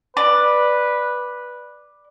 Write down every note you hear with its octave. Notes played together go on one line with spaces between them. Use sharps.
B4 D5